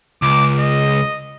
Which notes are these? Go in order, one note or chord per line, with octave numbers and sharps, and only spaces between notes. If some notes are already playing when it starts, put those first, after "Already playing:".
C#2 D6
D#5